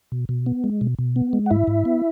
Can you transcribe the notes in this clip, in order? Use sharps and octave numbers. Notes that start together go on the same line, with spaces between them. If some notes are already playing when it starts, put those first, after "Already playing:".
B2
B2
B3
G#3
B2
B2
B3
G#3
F#5
G#2 E4 E5
G#2
B3